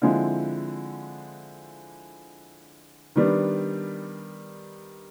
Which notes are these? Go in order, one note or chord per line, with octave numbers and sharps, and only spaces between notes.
D3 F3 G#3 C4 E4
D#3 G3 B3 D4